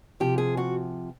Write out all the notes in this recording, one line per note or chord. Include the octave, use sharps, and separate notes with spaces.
C3 F3 G4
G#4
F#4